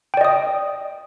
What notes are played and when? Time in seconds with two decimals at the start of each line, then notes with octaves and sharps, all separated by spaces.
0.14 G5
0.17 D5
0.21 D#5
0.25 D#6